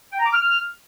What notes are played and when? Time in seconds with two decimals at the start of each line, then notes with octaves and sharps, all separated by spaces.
0.12 G5
0.19 A#5
0.26 D6
0.33 F6